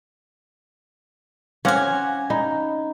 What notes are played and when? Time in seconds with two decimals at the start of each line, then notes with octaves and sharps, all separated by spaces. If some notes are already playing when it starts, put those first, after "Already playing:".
1.65 C4 C#4 C#5 F5 F#5 G#5 D6 A#6
2.30 D#4 A#5 B5